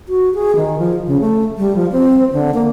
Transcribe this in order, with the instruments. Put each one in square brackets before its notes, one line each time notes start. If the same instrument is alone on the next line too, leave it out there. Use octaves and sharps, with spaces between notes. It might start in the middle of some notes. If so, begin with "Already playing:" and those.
[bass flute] F#4
G#4
D#3
F3
C#3
A3
G3
F3
C4
D3
A#3